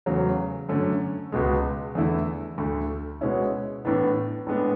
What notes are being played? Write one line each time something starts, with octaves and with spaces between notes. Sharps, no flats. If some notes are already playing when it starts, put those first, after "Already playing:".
E2 C#3 F#3 A3
F#2 D3 A3 C#4
C#2 B2 G#3
E2 D3 A3 E4
D2 D3 A3
B2 G#3 C#4 E4
A2 E3 B3 D4
A2 G#3 B3 D4